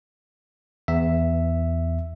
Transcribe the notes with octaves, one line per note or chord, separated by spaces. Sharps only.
E2 E5